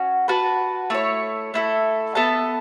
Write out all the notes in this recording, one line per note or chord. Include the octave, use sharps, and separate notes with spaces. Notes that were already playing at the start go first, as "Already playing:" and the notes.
Already playing: C#4 F#4
F#4 B4 A5
A3 E4 C#5
A3 E4 A4
B3 A4 E5 A5